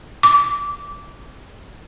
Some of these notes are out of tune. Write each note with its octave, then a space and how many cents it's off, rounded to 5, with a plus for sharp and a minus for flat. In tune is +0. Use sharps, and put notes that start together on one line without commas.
D6 -20